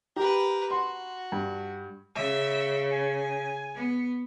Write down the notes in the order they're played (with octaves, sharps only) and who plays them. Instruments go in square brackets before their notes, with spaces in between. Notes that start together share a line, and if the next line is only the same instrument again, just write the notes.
[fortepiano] G4 [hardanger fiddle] A#4 B4
[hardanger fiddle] F#4 [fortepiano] C6
[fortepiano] G2
[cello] C#3 [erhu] E5
[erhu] G#5
[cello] B3